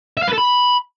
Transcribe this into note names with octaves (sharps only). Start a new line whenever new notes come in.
E5
F5
B4
A4
B5